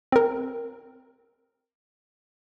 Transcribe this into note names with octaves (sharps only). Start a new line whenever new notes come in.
C4 A#4